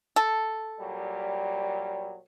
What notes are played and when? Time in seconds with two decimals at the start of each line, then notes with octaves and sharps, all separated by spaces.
0.16 A4
0.80 A#2 F#3 G3